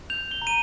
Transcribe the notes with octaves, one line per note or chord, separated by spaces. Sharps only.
G6 F7
G7
A#5
D#7